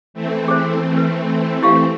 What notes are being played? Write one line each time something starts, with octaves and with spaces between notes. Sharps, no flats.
E3 A3 C4
G#4 C5
B4
E4 G4 F5